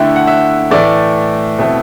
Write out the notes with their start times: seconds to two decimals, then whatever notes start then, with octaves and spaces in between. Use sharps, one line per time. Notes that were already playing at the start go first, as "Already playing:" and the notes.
Already playing: D3 A3 E4 G5
0.16 F#5
0.27 E5
0.71 A2 E3 A3 D5
1.59 B2 A3 C4 E4